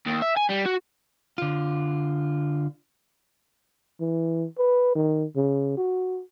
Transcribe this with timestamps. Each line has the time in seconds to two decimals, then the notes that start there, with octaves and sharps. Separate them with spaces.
0.07 D#2
0.22 E5
0.37 G#5
0.49 G3
0.66 F#4
1.38 D3 F4
4.01 E3
4.58 B4
4.95 D#3
5.36 C#3
5.78 F#4